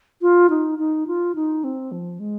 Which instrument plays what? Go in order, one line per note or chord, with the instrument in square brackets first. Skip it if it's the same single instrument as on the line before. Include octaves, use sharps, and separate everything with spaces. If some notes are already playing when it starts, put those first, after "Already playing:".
[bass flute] F4
D#4
D#4
F4
D#4
C4
F3
G#3